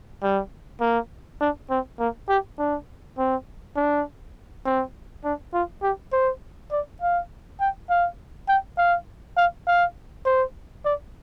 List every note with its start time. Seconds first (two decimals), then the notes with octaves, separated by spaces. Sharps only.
0.23 G3
0.81 A#3
1.41 D4
1.70 C4
1.99 A#3
2.29 G4
2.59 D4
3.18 C4
3.76 D4
4.65 C4
5.24 D4
5.54 F4
5.83 G4
6.13 C5
6.71 D5
7.02 F5
7.60 G5
7.90 F5
8.48 G5
8.78 F5
9.37 F5
9.67 F5
10.25 C5
10.85 D5